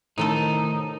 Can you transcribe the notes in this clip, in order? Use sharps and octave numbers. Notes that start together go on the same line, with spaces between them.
A2 C3 D#3 A3 D#4 A4